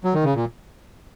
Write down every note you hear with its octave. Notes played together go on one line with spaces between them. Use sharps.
F#3
D#3
C#3
A#2